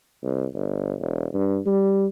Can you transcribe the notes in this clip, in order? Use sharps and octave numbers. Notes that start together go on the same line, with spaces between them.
C2
G1
E1
G2
G3